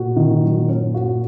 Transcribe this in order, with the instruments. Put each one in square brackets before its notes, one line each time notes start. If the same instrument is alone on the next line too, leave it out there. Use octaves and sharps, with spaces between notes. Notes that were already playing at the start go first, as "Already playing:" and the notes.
Already playing: [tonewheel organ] A#2 [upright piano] F#4
[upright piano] D#3
F#3
C#4
F#4